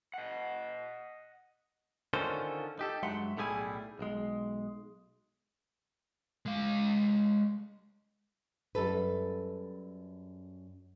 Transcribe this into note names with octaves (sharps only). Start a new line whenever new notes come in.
D#5 F#5
D3 D#3 C#4 F4 A4 C5
D#4 G4 A4
G2 F#3 G#3 E5 F#5 C6
B1 A2 G3 E4 G#4 G#5
B1 G#3
G#3 F5
F#2 G3 A4 B4